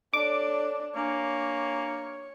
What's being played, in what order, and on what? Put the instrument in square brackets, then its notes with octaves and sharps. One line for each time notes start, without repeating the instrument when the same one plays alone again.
[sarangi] D4 [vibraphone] A4 C#5 [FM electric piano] D6
[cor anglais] A#3 [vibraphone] D4 G#5 A#5 [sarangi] C#5